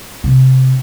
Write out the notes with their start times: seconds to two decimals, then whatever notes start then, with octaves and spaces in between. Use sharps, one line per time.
0.24 C3